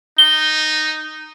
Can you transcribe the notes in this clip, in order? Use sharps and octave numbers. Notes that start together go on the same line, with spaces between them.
D#4 G7